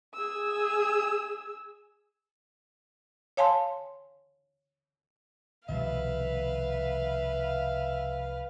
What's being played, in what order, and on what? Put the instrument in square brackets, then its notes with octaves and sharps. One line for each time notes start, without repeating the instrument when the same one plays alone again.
[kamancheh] G#4 E6
[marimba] C#5 F5 G#5 A5 C6
[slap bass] C2 F3 [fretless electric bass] B2 D#3 G3 [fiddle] B4 F5 [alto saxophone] E5